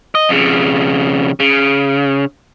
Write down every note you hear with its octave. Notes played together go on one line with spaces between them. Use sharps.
D#5
F2 C#3
C#3